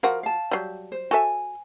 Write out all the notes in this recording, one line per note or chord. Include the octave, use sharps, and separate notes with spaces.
F3 F4 F#4 A#4
F5 A5
F#3 G3
C5
F#4 A4 E5 G#5